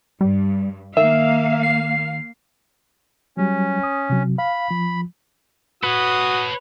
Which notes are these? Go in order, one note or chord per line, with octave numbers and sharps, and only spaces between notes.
G2 G3
D#3 A#3 E5 F5
C7
F#3 G3 C#4
D#6
C3 F#3
F5 B5
F3
F#4 A4 B4 C#5 D#6